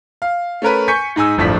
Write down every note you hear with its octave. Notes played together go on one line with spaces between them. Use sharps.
F5
A3 C#4 A#4 B4
G#5 C#6 G6 B6 C#7
G#2 D#4 G#5 E6
D1 G1 A2 F3 D4 B6